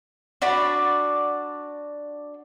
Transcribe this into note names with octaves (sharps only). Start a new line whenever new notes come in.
D4 F#4 D5 B5